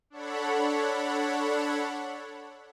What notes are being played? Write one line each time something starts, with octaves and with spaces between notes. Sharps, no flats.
D4 A4 C#5 F#5 B5